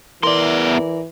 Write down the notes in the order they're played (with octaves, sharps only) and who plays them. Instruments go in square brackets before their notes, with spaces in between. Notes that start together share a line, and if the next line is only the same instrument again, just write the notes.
[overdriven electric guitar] E2 C6 [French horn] E3 [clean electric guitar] A#4 D5